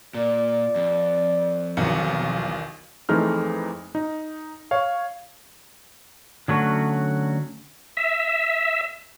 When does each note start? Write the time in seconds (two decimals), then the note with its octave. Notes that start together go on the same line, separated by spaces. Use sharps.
0.14 A#2 D5
0.75 F2
1.77 B1 E2 D#3 F3 C#7
3.09 F2 E3 G#3 A3 D#4 F6
3.95 D#4
4.71 C#5 F5
6.48 D3 F#3 A3 C#4 F#4
7.97 E5